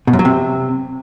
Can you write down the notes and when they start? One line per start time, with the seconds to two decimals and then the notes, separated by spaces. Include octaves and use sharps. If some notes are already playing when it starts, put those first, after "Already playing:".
0.07 B2
0.13 F#2
0.19 F#3
0.25 C3